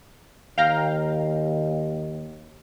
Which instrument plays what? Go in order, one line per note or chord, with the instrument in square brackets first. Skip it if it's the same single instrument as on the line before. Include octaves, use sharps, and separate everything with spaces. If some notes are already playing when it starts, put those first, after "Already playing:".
[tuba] D#2 [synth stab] F5 G5 A#5